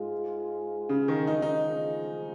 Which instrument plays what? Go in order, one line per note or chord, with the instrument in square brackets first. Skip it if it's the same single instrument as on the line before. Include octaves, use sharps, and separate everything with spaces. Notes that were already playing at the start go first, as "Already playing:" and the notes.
Already playing: [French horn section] G#2 G#3 F4 G#4
[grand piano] C#3
D#3
[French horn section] F3 G#3 F4 G#4 [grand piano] D#4
[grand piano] D#4